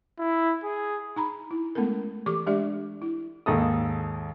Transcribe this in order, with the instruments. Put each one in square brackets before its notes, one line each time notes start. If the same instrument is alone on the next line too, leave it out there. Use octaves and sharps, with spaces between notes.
[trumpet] E4
G#4
[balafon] D#4 A#5 B5
E4
G#3 A3 B3 C#4 A4 A#4
E3 G4 A4 C#6 D6
G#3 D4 G4 D5 E5
E4
[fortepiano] D#2 G#2 A4 D#6